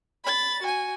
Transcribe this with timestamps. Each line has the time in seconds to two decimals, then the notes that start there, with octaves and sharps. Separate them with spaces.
0.24 B5 A6
0.62 F#4 G#5